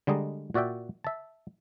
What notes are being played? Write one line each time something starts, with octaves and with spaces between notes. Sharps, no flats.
D3 G3 G#3 D#5 A#5
A#2 F#4 D5 E5 G5
E5 A5